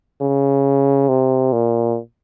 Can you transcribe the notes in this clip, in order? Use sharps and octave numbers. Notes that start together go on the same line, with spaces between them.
C#3
C3
A#2